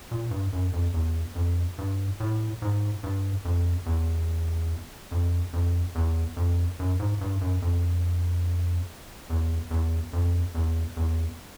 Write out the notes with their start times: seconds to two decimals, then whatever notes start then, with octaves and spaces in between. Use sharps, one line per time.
0.11 A#2
0.31 G2
0.53 F#2
0.73 F2
0.94 E2
1.35 F2
1.78 G2
2.20 A2
2.62 G#2
3.03 G2
3.45 F2
3.86 E2
5.11 F2
5.53 F2
5.95 E2
6.37 F2
6.79 F#2
7.00 G#2
7.21 G2
7.41 F#2
7.62 F2
9.30 E2
9.71 E2
10.13 F2
10.55 E2
10.97 E2